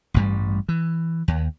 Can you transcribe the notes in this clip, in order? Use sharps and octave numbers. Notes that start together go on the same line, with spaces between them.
A1 G2 G3
E3
D#2